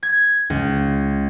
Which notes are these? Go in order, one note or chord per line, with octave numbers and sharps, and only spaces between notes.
G#6
C#2